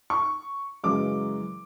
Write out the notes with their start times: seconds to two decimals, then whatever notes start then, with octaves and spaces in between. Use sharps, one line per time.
0.10 C#6
0.84 F#2 C#3 E3 G#3 D6